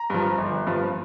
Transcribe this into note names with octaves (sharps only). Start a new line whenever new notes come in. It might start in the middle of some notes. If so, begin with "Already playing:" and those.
Already playing: A#5
G2 F3
G1
G2 F3